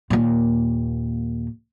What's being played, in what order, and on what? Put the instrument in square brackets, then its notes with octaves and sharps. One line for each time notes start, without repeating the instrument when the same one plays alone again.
[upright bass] D#2 A#2